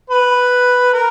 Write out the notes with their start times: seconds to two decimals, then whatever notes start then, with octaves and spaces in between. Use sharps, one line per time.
0.10 B4
0.93 A#4